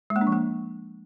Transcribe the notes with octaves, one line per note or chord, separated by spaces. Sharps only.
G#3
A#3
D4
F3
A#3